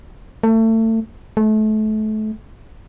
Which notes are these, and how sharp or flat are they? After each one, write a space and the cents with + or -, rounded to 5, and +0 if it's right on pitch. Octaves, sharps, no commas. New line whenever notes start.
A3 +30
A3 -30